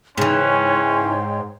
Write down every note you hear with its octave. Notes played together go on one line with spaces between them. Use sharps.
G#2 C#3 E3 C#4 C#5 G5 C6